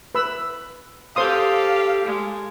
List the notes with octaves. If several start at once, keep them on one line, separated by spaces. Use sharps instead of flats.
B4 B5 E6
G4 A4 C5 F5 C6 D#6
G#3